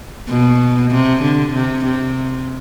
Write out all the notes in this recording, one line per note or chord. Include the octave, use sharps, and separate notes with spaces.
B2
C3
D3
C3
C3